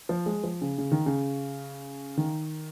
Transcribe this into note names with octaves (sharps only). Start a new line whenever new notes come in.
F3
G#3
F3
C#3
C#3
D#3
C#3
D#3